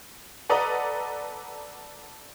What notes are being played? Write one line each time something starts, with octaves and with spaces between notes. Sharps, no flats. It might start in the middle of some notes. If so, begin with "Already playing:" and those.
A4 B4 D5 D#5 F#5 A#5